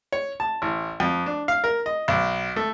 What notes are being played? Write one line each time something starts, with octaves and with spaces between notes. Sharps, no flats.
C#5
A5
A1
F2
D4
F5
A#4
D#5
B1
A3